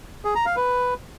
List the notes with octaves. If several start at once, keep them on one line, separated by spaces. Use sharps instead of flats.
G#4
A#5
F5
B4